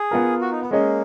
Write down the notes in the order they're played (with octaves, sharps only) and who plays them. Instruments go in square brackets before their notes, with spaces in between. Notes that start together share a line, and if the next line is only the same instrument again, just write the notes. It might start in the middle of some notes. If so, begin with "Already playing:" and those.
Already playing: [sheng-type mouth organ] G#4
[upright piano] B3 F4 A#4
[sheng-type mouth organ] F#4
D#4
B3
[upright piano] G#3 C#4 G#4 D#5 [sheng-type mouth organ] A#3